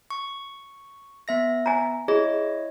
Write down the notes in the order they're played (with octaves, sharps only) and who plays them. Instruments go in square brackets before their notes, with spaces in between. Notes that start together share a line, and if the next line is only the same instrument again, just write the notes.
[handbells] C#6
B3 E5 A#6
[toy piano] G#5 A#5
[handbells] E4 C#5 D#5 [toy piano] G#4